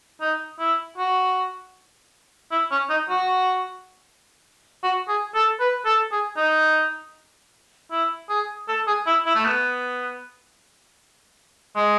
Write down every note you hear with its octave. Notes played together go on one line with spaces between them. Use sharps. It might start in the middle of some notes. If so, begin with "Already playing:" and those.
D#4
E4
F#4
E4
C#4
D#4
F#4
F#4
G#4
A4
B4
A4
G#4
D#4
E4
G#4
A4
G#4
E4
E4
A3
B3
G#3